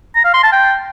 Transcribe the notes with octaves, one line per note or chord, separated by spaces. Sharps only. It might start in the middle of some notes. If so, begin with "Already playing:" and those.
A#5
F5
C6
A5
G5